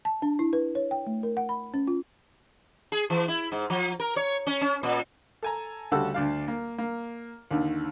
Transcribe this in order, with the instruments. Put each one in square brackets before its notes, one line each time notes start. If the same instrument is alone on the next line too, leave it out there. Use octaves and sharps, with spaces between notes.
[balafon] A5
D4
E4
B4
C#5
G5
A3
A#4
F#5
B5
C#4
F4
[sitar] G#4
E3
E4
G#2
F3
A#4
C#5
C#4
C#4
A#2
[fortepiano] A4 G#5 A#5
D2 C#3 G3 F#4 A4 E6
D2 D4 F5
A#3
A#3
D#2 D3 D#3